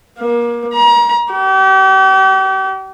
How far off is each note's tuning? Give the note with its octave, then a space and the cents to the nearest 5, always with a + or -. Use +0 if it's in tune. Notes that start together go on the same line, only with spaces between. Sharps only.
A#3 +30
A#5 +35
G4 -40